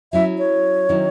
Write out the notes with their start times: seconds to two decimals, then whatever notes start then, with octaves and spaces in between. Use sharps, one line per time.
0.13 F#3 C#4 E4 E5
0.38 C#5
0.89 D#3 F#3 C#4 E4